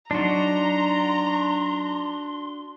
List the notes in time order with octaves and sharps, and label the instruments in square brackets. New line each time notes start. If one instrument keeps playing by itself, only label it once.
[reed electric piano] F#3 D#4 [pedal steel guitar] D4 F#4 [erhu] A#5 [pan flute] C6